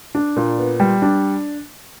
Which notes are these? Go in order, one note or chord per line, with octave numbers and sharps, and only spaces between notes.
D4
A#2
B3
G3
D4